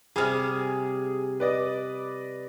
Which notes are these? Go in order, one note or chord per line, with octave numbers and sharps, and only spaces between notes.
C3 G3 G#4 F6
B4 D5 D#5